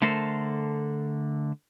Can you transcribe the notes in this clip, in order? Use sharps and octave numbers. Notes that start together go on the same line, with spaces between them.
D3 A3 A4 A#4 C5